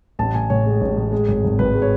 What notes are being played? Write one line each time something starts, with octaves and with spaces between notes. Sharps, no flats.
A1 A5
A2 G#5
A2 C#5
G#3
A1
A2
G#3
G#1
G#1
G#1 B4
G#3
C#5